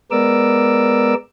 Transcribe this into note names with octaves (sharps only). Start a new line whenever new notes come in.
G#3 B3 A#4 D5 D6 E6